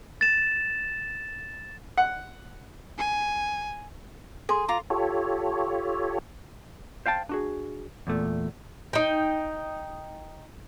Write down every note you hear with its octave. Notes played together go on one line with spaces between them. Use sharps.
A6 E7
F#5
G#5
G#4 A4 C6
F4 A#5 D6
F4 G4 A4 C#5
C5 F5 G5 A5
D4 F#4 G#4
E2 A#2 A3
D#4 G5